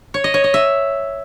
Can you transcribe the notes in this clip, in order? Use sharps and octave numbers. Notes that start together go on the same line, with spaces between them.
C#5
D#5
C#5
D#5
E5